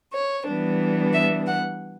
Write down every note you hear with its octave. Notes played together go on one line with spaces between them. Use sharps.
C#5
E3 G3 B3 D4
E5
F#5